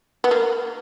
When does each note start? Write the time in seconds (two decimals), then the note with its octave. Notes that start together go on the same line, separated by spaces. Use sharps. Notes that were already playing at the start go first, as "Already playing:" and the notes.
0.24 B3
0.31 A#3